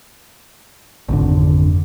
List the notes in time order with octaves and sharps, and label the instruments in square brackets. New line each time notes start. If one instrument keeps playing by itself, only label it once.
[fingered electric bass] G#1 F2 D3